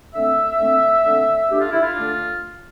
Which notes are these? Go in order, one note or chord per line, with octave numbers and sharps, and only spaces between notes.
D3 A3 C4 E5
D3 A3 C4
D3 A3 C4
D3 A3 D4 G4
F4
E4
F4
D3 A3 D4